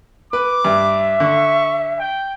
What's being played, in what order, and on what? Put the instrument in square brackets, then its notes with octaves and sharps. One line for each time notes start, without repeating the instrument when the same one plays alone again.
[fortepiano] B4 [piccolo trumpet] D6
[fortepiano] G2 [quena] E5
[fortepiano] D3 [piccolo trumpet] C#6
[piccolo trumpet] G5